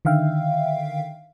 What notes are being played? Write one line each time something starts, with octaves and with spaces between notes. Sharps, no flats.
D3 D#3 E5 F5 G5